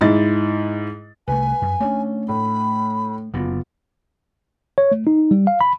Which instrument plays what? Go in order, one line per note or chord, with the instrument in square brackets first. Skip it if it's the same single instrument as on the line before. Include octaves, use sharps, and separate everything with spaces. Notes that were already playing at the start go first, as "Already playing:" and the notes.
[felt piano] G#2 E4 D#5 A6
[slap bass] C2 A3 [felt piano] B4 [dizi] G#5
[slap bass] F#2
[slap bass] A3 A#3 D4 [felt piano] C#4
[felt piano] A2 [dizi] B5
[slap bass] F#1 F#2 D3 [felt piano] B3 F4
[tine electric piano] C#5
A3
D#4
G3
F5
B5